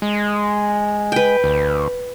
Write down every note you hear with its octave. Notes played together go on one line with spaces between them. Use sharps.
G#3
B4 G5
D2